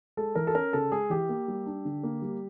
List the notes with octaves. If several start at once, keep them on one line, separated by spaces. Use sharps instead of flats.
G#3 A4
E3 A#4
A4
C#4 A#4
C#3 A4
G#3 G#4
E3 G4
A#3
G3
D4
D3
A#3
G3